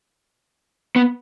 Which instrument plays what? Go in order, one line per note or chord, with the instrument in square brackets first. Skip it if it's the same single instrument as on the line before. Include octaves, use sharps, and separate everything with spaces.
[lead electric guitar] B3